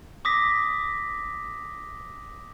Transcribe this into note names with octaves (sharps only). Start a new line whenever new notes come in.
D6 D#6 A#6 B6